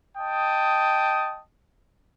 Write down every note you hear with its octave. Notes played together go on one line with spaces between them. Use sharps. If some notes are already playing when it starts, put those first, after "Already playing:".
D#5 G5 A5 D#6